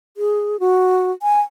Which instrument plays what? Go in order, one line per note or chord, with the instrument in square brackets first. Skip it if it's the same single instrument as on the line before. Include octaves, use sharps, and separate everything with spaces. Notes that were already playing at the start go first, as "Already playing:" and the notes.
[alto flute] G#4
F#4
G#5